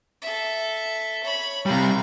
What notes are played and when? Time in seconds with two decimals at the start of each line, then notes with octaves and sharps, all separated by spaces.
0.22 A4 E5
1.23 C#5 B5
1.66 C3 G3 F5 A#5